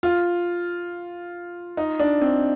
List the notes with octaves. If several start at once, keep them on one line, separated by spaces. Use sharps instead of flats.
F4
D#4
D4
C4